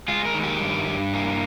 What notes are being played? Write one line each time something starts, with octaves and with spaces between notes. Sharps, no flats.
G#3 F4
A#4
D#3
G4
G2
G2
A#3